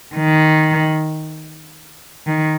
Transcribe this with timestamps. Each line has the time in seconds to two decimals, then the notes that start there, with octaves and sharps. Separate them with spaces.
0.16 D#3
2.27 D#3